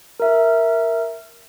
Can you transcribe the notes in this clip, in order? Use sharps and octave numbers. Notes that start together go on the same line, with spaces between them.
A#4 E5